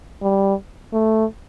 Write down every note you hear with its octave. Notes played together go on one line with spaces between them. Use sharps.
G3
A3